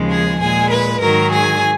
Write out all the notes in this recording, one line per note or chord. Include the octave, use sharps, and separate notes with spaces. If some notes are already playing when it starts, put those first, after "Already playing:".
Already playing: D#2 C#3 F3 G#3
G#4 G#5
A#2 G#3 G#4 G#5
B4 B5
G#2 D#3 F#3 A#4 A#5
G#4 G#5